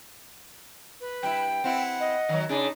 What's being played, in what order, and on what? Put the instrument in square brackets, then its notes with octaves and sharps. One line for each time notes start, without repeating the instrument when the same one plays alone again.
[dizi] B4
[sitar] G2 E4 [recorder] G5
[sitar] C4 E4 [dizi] F#5
[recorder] D#5
[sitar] D#3 F#3
[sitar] C#3 D4 [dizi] D#4 [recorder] G#4